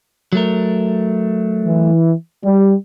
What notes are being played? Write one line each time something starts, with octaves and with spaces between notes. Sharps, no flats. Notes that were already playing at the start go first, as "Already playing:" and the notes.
F#3 A3 A#4
E3
G3